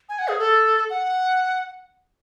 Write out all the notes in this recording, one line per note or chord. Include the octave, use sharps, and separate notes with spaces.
G#5
F#5
G#4
A4
F#5